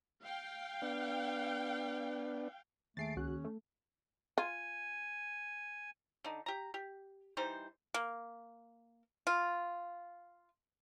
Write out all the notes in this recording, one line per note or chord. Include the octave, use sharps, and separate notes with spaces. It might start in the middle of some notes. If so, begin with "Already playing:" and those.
F5 G5
B3 D4
D#2 A3 G#4 A6 C7 D7
C#2 C#4 F#4 F#6
A3
F4 G#5
D3 D#4
G4 A#5
G4
E3 G3 D#4 C5
A#3
F4